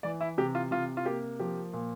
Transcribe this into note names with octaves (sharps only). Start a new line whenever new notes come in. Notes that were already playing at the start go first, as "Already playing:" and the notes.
E3 D5
E4
C3 G4
F4
C3 F4
F4
A#3 G4
F3 G4
A#2